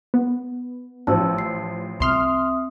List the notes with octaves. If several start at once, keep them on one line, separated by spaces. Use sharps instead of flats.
B3
A1 F3 A5 E6
C7
C2 C4 E5 C6 D#6 F6